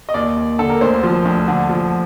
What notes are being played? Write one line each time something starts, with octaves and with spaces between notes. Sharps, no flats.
D#5
D#2 D5
D#2
D3 A4
A#4
D2 C5
F3
D2
D3
F3